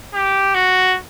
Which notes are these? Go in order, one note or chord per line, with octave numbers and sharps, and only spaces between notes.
G4
F#4